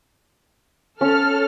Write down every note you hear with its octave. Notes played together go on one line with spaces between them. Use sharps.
C#4 A4 F6